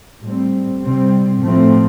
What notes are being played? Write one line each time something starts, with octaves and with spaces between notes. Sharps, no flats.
A2 G3 C4
C3 G3 C4
A2 F3 A3 C4